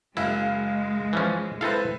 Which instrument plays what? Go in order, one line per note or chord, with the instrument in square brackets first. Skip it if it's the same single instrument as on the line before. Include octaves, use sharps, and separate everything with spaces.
[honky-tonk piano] F#1 F5 [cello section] G#3 [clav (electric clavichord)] E4
[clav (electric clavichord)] E3 F3 C#4
[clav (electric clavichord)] C4 A4 F5 [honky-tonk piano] E4 B4